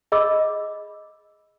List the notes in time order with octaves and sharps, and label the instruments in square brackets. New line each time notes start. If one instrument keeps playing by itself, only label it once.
[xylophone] G#4 D#5 B5 D6 E6